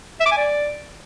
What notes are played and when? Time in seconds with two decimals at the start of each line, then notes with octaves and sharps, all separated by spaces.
0.20 E5
0.26 D6
0.32 G#5
0.38 D5